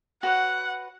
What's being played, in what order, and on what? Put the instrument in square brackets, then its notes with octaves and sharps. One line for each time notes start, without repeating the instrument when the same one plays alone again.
[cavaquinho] F#4 B4 C#5 [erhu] F#5